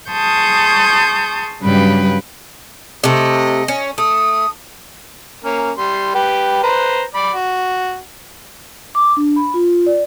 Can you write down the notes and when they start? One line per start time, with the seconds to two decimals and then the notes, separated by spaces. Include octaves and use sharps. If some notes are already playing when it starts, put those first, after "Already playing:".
0.11 G#4 A5 C6 C#6 D#6 G6
1.60 G2 C#3 F#3 G3 B4 G5
3.04 C3 A3 D#5
3.68 C#4
3.98 A3 D#6
5.44 A#3 C#4
5.77 G3 C6
6.15 G4 B4
6.63 B4 C5 A#5
7.15 D5 B5
7.34 F#4
8.95 D6
9.17 D4
9.36 B5
9.54 F4
9.86 D5